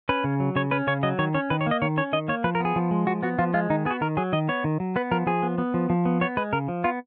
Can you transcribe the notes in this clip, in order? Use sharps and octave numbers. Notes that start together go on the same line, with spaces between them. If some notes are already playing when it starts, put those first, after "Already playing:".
C#4 B4
C#3
F#3
C#3 C#5
C#4 B4
C#3 C#5
F#3 D#5
D#3 C#5
C#4 C#5
D#3 B4
C#5
A#3 D#5
D#3 C#5
C#4 C#5
D#3 D#5
A#3 C#5
F3 B4
A#4
B3 G#4
F3
G#3
F3 F#4
B3 F#4
F3 F4
G#3 F4
D#3 D#4
B3 G#4
F#4
D#3 A#4
F#3 G#4
D#3 D#5
B3 C#5
D#3
F#3
B3 B4
F3 A#4
F3 G#4
B3
B3
F3
F3
B3
B3 C#5
G#3 B4
C#3 A#4
F3
B3 F4